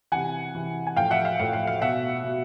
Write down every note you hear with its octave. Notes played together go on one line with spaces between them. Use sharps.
C3 E3 F#5 G#5
C3 E3
G#5
A2 F3 F5 G5
E5 F#5
F5
A2 F3 F5
F5
F5
B2 E5 F#5
B2